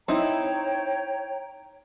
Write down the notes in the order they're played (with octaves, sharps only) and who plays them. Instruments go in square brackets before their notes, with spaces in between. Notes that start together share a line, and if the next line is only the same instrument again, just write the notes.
[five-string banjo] C4 D#4 E4 [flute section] C#5 G5 A#5